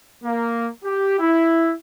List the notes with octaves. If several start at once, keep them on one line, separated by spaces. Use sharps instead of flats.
A#3
G4
E4